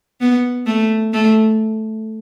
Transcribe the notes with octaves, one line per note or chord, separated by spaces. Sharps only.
B3
A3
A3